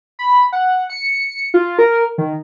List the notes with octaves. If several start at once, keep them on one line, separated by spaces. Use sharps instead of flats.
B5
F#5
C#7
F4
A#4
D#3